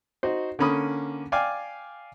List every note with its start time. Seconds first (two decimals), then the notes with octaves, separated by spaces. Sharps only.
0.23 D#4 F#4 C5
0.59 D3 A#3 C#4 B5 D#6
1.32 D5 F5 G5 G#5 D6